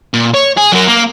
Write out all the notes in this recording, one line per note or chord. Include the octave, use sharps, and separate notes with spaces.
A#2
C#5
G#4
F#3 A#4
A#3